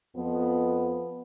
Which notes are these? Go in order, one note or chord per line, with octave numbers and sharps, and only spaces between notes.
F2 F3 B3